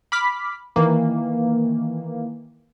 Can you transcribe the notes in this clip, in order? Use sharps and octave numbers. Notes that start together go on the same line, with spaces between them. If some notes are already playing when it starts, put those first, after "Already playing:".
B5 D6 F6 B6
D#3 E3 A#3